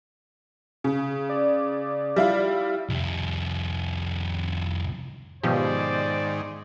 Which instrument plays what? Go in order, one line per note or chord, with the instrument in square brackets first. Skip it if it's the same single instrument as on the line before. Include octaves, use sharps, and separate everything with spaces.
[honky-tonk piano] C#3
[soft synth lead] D5
[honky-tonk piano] G3 E4 F4
[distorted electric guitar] C2 F2
[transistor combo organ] G#2 D#3 [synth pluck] B2 F3 G4 [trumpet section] C5 D5